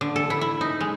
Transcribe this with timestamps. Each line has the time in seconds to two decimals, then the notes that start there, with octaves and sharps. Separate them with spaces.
0.01 D3
0.16 A4
0.30 E4
0.41 E4
0.61 D#4
0.80 G#3